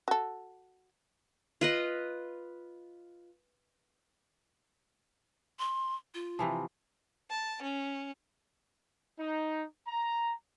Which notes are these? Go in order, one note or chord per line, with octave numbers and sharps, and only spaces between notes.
F#4 A4
F4 B4 D#5
C6
F4
C3 E3 F3
A5
C#4
D#4
A#5